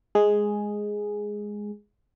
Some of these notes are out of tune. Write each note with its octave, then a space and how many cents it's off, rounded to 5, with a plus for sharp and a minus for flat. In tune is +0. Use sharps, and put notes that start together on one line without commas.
G#3 +0 G#4 +0